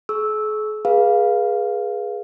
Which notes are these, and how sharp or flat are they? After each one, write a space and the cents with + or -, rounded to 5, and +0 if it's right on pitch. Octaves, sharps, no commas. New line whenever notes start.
G#4 +45 C#6 +10 E6 -10
G#4 +0 B4 -35 F5 +0